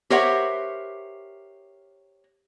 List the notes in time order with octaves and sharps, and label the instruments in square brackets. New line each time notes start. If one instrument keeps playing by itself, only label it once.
[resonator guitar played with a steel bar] G4 A#4 C5 C#5 E5 F#5